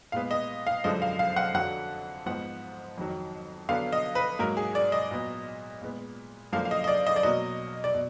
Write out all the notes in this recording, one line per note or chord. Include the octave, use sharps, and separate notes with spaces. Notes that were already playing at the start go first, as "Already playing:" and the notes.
A#2 G#3 B3 F5
D#5
F5
F#2 D3 F3 G#3 D#5
F5
F5
F#5
F2 D3 F#3 F#5
G#2 F3 B3 F#5
F2 D#3 F#3
D3 F#3 B3 F5
D#5
B4
G#2 F#3 A#3 A#4
G#4
D5
D#5
A#2 F#3 B3
A#2 G#3 B3
F#2 D3 F3 A#3 F5
F5
D#5
D#5
D5
D#5
D5
B2 F#3 A#3 D#5
D5
B2